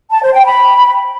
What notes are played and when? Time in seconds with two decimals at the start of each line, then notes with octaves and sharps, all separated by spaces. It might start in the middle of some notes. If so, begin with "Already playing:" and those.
0.10 A5
0.22 C5
0.34 G5
0.45 B5